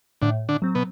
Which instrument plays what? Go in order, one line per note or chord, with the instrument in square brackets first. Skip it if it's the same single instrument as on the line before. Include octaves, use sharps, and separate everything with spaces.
[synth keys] A2 [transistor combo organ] D3 D4
[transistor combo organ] D3 D4
[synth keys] F#3 C4
[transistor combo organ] B2 B3